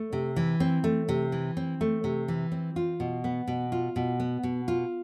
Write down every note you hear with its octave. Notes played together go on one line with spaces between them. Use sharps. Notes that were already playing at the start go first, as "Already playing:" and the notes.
Already playing: A3
C3
E3
C4
A3
C3
E3
C4
A3
C3
E3
C4
F4
B2
B3
B2
F4
B2
B3
B2
F4